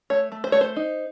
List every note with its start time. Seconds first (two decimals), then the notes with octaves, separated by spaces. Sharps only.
0.10 A3 C#5
0.32 A3
0.44 C5
0.52 A3 C#5
0.61 C5
0.76 D#4